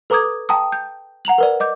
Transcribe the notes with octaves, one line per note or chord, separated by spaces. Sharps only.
A4 B4 A#5 D6 D#6 G#6
G5 A5 A#5 D#6
G6
F#5 A#5 F7 F#7
A#4 B4 D5
D#5 D6 G6